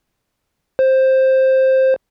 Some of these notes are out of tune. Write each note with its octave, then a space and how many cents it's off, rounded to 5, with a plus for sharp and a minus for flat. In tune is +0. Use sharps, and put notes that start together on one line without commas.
C5 +10